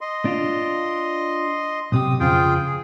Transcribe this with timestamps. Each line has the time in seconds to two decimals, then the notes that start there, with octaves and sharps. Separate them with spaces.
0.01 D#5 C6
0.25 D4 F4
1.92 B1 C3 G4 D#6
2.20 F2 C#3 F3 F4 G#4 G5
2.66 G#4